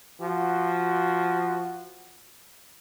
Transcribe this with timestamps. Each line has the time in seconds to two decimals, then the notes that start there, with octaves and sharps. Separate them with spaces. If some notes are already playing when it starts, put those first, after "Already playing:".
0.22 F3 F#4